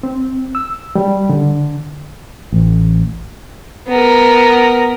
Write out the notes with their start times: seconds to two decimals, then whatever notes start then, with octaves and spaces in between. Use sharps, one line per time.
0.03 C4
0.55 E6
0.95 G3
1.29 D3
2.52 A1
3.88 B3 A#4